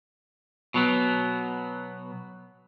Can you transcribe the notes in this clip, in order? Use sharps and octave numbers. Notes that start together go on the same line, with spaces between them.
B2 F#3 B3